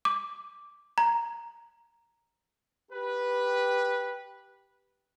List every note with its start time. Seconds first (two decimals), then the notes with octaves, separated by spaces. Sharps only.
0.05 D6
0.98 A#5
2.92 G4 B4